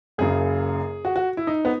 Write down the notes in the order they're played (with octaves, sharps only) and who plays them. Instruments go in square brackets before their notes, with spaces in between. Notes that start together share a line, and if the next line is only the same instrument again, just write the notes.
[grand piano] F#1 F#2 C#3 [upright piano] G#4
[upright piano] F#4
F#4
E4
D#4
B3